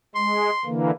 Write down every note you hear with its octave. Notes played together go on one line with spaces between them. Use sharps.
G#3 C6
D3 E3 A#3